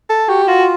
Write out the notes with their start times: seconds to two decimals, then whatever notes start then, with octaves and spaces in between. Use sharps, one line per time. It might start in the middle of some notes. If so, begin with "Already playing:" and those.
0.10 A4
0.28 F#4 G4
0.48 F4 F#4